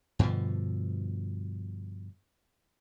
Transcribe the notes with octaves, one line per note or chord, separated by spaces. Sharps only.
G2 B2 D3 F3